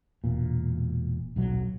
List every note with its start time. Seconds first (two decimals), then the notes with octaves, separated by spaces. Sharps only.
0.24 E1 A#2
1.36 D#1 B1 F#3